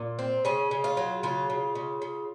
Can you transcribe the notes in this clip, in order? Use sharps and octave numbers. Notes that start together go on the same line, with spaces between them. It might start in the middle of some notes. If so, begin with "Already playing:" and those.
Already playing: A#2
C4
C#3 C#4
C#3
F4
F#3
C#3 F4
C#3
C#3
C#3